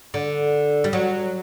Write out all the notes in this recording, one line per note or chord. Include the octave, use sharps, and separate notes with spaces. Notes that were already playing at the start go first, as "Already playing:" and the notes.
D3
G3
F#3